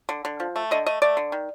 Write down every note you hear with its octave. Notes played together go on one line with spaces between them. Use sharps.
D3
D3
F3
A3
D3 D#5
A3 D#5
A3 D5
D3
D#3